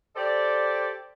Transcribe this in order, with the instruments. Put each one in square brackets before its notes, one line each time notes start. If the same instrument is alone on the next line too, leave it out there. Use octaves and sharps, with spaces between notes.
[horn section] G4 A4 C5 D5